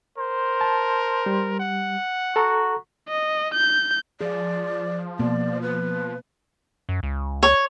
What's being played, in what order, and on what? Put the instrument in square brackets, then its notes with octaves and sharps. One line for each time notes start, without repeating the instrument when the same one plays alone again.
[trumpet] A#4 [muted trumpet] C5
[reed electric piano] A5
G3
[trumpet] F#5
[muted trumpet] F#4 [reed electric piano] A4 A#5
[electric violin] D#5
G6
[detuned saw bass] F3 [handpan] G#4 [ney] D5
[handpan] B2 A#3 B3 [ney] D5
[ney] B4
[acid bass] F#2
C#2
[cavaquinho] C#5